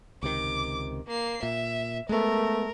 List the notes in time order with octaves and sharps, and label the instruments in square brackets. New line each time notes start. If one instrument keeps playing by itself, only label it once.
[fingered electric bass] C#2 C3 D#3 [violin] D6
[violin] A#3 C7
[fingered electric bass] A#2 [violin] E5
[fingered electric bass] G#3 B3 [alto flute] A3 [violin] A#4